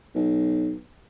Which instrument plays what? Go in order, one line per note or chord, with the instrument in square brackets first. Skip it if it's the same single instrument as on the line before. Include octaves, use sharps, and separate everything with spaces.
[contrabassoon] B1